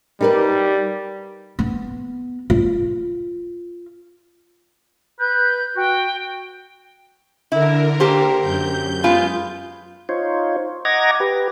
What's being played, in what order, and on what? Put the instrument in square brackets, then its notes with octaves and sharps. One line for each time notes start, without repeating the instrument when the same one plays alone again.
[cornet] G3 [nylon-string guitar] D#4 A#4 B4
[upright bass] B3
F4
[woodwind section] B4 [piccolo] G6
[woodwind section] F#4 [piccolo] G5
[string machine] D3 A#4 [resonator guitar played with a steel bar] E4
[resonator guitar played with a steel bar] A#3 G4 C5
[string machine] F#2 G6
[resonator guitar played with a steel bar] G#3 B3 F4
[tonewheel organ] D#4 F4 C5 C#5
D#5 F#5 A#5 D6 G#6 A#6
G4 B4